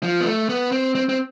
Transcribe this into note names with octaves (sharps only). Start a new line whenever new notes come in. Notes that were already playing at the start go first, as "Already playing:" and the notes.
F3
B3
A3
B3
C4
C4
C4